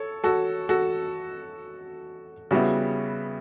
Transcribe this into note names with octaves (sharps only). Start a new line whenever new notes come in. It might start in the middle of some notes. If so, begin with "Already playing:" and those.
Already playing: A4 C#5
F#4 A4
F#4 A4
C#3 G3 B3 E4 F#4